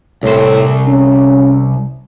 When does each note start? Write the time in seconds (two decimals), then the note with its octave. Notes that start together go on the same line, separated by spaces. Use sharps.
0.23 C2 A2 C5
0.87 C#4